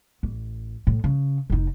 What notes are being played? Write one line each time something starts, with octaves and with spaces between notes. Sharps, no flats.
A1
A2
C#3
F1 D#4